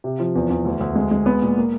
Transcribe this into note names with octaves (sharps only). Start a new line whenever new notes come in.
C3
F3
E2
E2
D2
D2
G#3
G#3
B3
A#2
A#3